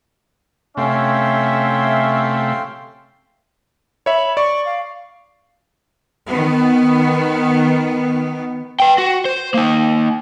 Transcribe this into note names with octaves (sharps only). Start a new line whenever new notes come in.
C3 A3 C#4 E5 F5 G5 C6
C#5 E5 B5
D5 C#6
F5
D#3 B3
B4 G5
F#4
C5
A#3 D#4